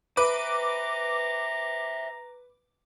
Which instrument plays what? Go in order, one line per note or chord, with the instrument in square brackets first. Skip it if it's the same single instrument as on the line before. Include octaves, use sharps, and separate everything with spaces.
[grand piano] B4 [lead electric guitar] C5 E5 [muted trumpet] A#5 [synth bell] D6